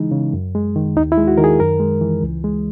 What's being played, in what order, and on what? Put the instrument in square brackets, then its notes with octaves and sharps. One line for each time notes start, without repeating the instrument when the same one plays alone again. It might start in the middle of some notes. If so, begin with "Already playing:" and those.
Already playing: [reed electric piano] C#3 E3 G#3 D#4
C#3
F#2
G#3
D#3
D#2 D#4
E4
G#3
F#4
D#3 A#4
G#4
F#2 A#4
G#3
E3
C#2
G#3